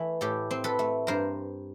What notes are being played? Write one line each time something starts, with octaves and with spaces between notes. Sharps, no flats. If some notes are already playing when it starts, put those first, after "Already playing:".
Already playing: E3 A3
A2 G4 A4
C4
A4 B4
A3
G2 A#4 C5